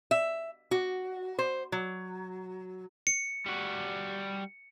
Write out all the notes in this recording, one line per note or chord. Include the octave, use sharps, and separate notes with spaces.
E5
F#4
C5
F#3
C#7
G3 F#4